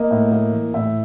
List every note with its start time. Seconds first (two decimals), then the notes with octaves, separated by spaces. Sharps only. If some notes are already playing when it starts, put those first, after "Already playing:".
Already playing: A#3 D#5
0.11 A2
0.32 A#3
0.53 E3
0.74 A2 E5